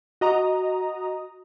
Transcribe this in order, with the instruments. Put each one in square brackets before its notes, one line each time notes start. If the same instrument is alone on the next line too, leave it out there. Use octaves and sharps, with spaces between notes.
[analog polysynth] F#4 D#5 A#5 D#6